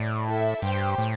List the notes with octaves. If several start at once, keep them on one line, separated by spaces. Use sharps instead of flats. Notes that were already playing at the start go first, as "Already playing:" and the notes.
Already playing: A2 D5
E4 A4 E5
G2 G4 C5 G5
A2